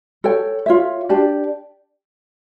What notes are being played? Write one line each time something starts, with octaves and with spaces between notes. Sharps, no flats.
A4 C#5 G5
F4 C#5 E5
D4 G4 D5 A5